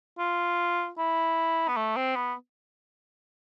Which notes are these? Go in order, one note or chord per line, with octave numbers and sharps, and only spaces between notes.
F4
E4
B3
A3
C4
B3